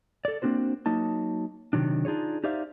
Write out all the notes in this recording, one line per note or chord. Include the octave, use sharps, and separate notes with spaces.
A4 D5
A#3 C4 D4 F#4 C5
F#3 A#3 D#4 A5
C3 D#3 F#3 D4
D4 D#4 F4 G#4 C#5
D#4 G4 C5 D5 E5 F5